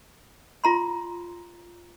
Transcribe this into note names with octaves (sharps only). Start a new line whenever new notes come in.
F4 A#5 C6